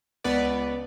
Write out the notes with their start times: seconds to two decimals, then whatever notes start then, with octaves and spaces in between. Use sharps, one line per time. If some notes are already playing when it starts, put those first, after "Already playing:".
0.24 C#2 B3 B4 D5